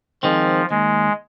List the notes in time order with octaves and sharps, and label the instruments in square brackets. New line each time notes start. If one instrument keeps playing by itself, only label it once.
[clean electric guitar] D#3 G#3 C4 [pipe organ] F3
[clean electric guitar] D#2 [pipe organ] G#3